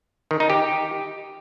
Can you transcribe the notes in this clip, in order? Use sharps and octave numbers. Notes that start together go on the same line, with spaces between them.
D#3
D#4
G4